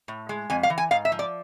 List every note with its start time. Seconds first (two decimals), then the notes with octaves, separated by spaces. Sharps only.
0.08 A2
0.29 G#3
0.50 F2 G#5
0.63 F5
0.70 E3
0.78 G#5
0.91 G#2 F5
1.05 E5
1.12 F3
1.19 D5